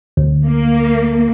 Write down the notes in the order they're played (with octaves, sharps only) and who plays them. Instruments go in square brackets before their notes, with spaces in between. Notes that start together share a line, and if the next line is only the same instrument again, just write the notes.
[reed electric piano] D2
[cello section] A#3